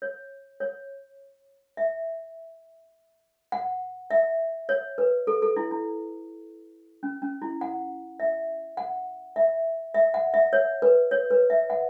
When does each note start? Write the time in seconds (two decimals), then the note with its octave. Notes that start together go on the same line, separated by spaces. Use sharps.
0.02 C#5
0.60 C#5
1.77 E5
3.52 F#5
4.11 E5
4.69 C#5
4.98 B4
5.27 A4
5.42 A4
5.56 E4
5.71 E4
7.03 C#4
7.22 C#4
7.42 E4
7.61 F#5
8.20 E5
8.77 F#5
9.36 E5
9.95 E5
10.14 F#5
10.34 E5
10.53 C#5
10.82 B4
11.11 C#5
11.31 B4
11.50 E5
11.70 F#5